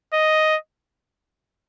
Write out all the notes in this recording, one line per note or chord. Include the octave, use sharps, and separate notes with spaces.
D#5